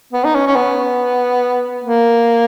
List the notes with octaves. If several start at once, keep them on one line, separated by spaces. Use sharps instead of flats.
B3
D#4
C#4
C#4
B3
A#3